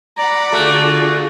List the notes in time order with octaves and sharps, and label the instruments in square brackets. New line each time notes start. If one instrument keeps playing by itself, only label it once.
[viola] D5 [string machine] F#5 B5 [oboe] A#5
[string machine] D3 F4 G#4 [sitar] A3 [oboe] F#4